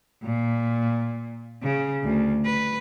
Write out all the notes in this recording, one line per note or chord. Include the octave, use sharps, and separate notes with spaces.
A#2
C#3
D2
B4